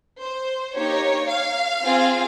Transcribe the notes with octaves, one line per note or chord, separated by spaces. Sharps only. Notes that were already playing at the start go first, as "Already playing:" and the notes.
C5
A#3 D#4 G4 C#5
F5
C4 F4 G#4